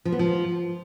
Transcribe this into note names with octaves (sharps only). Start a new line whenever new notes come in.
F3
B3
F3